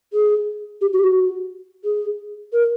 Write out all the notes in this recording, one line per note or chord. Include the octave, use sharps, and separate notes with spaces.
G#4
G4
F#4
G4
F#4
G#4
A#4